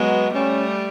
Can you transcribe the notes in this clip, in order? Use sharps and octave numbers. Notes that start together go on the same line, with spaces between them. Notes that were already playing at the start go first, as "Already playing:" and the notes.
Already playing: F#3 G#3 B3
G3 A3 C#4